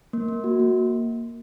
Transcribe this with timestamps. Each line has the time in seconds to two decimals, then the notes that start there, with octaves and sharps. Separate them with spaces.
0.13 A#3
0.29 A#3
0.44 F#4
0.60 A#3